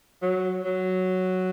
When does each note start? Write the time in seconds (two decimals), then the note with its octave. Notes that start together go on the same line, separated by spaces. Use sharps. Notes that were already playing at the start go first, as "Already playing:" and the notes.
0.22 F#3
0.63 F#3